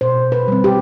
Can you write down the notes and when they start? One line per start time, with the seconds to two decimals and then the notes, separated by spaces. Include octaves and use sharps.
0.01 B2 C5
0.32 B4
0.48 G3 C4
0.64 G4